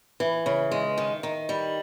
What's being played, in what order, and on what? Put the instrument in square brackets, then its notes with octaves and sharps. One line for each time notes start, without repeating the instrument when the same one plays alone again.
[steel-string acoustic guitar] E3
C#3
G#3
D#3
D#3
G3